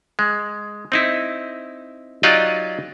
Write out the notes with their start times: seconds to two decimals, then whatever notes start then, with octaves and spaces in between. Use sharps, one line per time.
0.19 G#3
0.92 C4 D#4 E4
2.23 F#3 D#4 F4 G4 D5 D#5